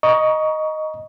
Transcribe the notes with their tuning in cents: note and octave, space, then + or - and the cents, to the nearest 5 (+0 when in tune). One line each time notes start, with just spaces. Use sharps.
D#5 +0 A#5 +25 C#6 +15